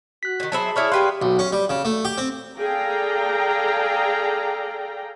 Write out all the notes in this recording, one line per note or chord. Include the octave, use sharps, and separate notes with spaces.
F#4 F#6 B6
A2 D#3
F#3 G#4 C5 E5 A5 B5
E4 G#4 C#5 D5 B5 C#6 F6
G4 G#4 B4 D5 F5 C6 F#6
B1
C#4
G3
C#3
A3
G4
C4
G#4 A4 D5 F5 G5 A#5